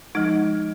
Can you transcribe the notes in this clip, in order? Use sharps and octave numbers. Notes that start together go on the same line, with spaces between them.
F3 G#3 D#4